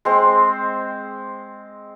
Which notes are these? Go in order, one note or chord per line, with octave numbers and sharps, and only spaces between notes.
G#3 C4